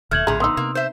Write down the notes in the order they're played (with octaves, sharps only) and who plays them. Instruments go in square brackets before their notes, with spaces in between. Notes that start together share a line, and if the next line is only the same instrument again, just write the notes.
[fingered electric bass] D#1 D#2 B2 [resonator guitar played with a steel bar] A3 [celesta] F6 G#6 F#7
[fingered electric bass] A#1 A2 [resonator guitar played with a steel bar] F2 D3 [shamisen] G#4 A#5
[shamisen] B3 D#4 [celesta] C6 D#6 E6
[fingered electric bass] C3 [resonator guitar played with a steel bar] A#3
[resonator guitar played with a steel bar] C5 E5